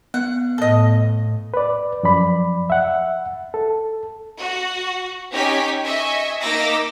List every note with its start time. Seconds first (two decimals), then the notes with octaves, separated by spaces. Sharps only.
0.14 B3 F#5
0.58 A2 A4 D#5
1.54 B4 D5
2.03 F#2 F3 D5 B5
2.70 E5 F#5
3.54 A4
4.39 F#4
5.31 C#4 D#4 G4 G#5 B6
5.85 D#5 E5 G#5 C#6
6.41 A#3 D#4 D6 E6 A#6 B6